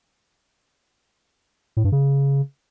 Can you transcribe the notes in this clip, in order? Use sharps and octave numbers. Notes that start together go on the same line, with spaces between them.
A2
G2
C#3